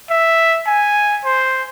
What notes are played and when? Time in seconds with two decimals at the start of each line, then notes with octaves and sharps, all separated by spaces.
0.10 E5
0.66 G#5
1.25 C5